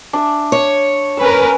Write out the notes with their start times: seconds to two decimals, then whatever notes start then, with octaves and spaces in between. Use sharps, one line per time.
0.13 D4 E5
0.52 C#5
1.17 C#4 A#4 B4 E6